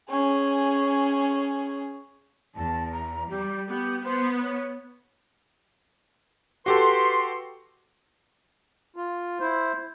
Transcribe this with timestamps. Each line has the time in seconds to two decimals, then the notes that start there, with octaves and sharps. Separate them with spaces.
0.10 C#4 G#4
2.55 E2 A5
2.92 A#5
3.30 G3 G4
3.69 B3 G4
4.04 B3 C5
4.41 C#5
6.66 F#4 G4 A4 B4 C6
8.96 F4
9.40 E4 C5